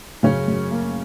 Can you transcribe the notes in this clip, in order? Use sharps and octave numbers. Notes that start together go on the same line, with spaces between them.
F#2 C#3 C#4
F#2
A#3